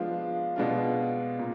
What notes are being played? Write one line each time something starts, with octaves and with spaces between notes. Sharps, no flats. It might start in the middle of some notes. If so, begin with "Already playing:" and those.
Already playing: F3 G#3 B3 D4 F4
B2 G#3 D4 F4
A#2